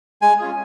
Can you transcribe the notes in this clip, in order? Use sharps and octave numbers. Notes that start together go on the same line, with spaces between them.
G#3 G#5
C#4 F4 G#4